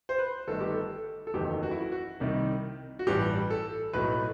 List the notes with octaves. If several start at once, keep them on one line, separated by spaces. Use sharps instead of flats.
C5
B4
G1 G2 D#3 A3 A4
G4
A4
A4
F#1 E2 D#3 F#3 A3 G4
F#4
E4
F#4
F#4
C2 C3 D#3 G3
F#4
A1 G2 E3 G3 G4
A4
B1 A2 F#3 A3 B4